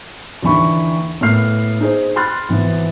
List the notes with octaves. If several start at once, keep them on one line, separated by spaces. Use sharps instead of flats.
D#2 D3 E3 B5 C#6
A2 A#3 B3 F6 C7
D#4 G#4 C5
B5 C6 F6 F#6 A6
G#1 E3 B3